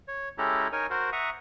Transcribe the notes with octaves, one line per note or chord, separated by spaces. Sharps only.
C#5
G#3 C#4 E4 G4 A4 A#5
D#4 A#4 C#5 G#5
F#4 A#4 C5
E5 F#5 A#5 C#6 D#6